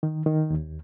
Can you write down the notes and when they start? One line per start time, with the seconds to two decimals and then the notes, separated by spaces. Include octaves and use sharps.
0.03 D#3
0.26 D#3
0.50 D#2